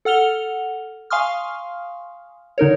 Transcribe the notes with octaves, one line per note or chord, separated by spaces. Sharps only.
A4 F#5 F6 F7 G7
F5 G#5 C6 C#6 D#6 F6
D3 D#4 A#4 C#5